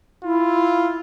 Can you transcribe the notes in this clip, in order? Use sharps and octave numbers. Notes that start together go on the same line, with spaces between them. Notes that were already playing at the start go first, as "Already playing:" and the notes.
E4 F4